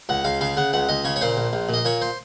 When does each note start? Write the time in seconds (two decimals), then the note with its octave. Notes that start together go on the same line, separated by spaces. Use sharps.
0.09 C#2 F#5
0.24 C#2 F5
0.41 C#3 F5
0.57 C#3 F#5
0.73 C#2 F#5
0.89 C#2 D#5
1.04 C#3 C#5
1.16 C#5
1.21 A#2 C5
1.37 A#1
1.53 A#1
1.69 A#2 D#5
1.85 A#2 C#5
2.01 C5